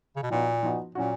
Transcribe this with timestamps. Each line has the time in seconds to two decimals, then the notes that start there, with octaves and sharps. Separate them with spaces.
0.16 C#3
0.23 B2
0.30 A#2 F3 B3 D#4 F#4
0.63 F3 B3 D#4 F#4
0.95 A#2 F#3 C#4 F#4